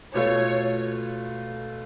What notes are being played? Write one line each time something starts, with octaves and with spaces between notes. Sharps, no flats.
B2 A3 F4 C#5